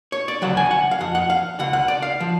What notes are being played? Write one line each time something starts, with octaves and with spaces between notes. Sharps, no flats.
C#5
D5
D2 C#3 F#3 F#5
G#5
F#5
F5
F2 F3 F#5
F#5
F5
C#2 C#3 F#5
F#5
D5
F5
F3